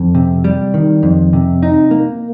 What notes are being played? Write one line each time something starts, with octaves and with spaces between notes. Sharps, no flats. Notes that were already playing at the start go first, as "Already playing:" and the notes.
Already playing: F2
C3
G3
D#3
F2
C3
D#4
A#3